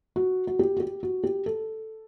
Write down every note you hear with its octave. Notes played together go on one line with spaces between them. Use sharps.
F#4
F#4
G4
F#4
G4
F#4
G4
A4